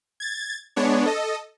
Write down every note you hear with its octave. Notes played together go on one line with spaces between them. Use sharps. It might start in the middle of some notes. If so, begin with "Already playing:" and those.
G#6 A6
G#3 B3 D4 C#5
A4 D#5